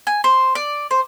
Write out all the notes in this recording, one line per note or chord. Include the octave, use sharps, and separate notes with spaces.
G#5
C5
D5
C5